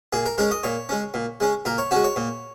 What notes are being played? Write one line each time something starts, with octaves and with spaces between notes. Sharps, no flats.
A#2 G#4
A#4
G#3 C#4 A#4
D#5
A#2 C#5
G#3 C#4
A#2
G#3 C#4
A#2 A#4
C#5
G#3 C#4 F#4
C#5
A#2